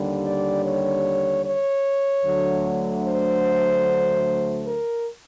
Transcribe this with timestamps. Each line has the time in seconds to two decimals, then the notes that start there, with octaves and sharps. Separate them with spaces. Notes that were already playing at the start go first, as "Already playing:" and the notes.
Already playing: D#2 D3 G3
0.25 D5
0.64 C#5
1.44 C#5
2.25 D2 D3 F#3 A3
3.05 C5
4.65 A#4